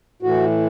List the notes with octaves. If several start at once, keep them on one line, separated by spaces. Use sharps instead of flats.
A2 E3 F#4